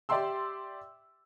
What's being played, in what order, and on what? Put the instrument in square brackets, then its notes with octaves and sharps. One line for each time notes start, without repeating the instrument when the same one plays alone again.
[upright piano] G4 D5 E5 G5 C6 E6